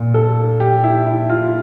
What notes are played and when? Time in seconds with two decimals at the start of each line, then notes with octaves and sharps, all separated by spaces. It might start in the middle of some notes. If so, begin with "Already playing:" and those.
Already playing: A#2
0.14 A4
0.60 G4
0.84 E4
1.07 E4
1.30 F4